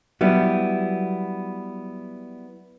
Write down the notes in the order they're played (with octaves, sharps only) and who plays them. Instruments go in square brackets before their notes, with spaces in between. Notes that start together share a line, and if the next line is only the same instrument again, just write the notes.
[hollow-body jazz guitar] F#3 G3 B3 E4